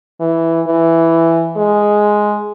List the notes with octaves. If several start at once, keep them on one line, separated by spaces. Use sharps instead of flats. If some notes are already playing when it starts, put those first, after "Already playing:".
E3
E3
G#3